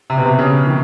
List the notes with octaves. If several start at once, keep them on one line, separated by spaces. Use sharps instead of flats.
C3
B2
C3
C#3
D#3